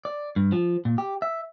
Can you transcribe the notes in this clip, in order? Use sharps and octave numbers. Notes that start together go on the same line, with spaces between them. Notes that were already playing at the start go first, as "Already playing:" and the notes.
D5
G2
F3
A#2
G4
E5